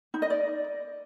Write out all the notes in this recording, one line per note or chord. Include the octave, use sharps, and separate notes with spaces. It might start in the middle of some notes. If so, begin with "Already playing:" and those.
D#4
D#5
D5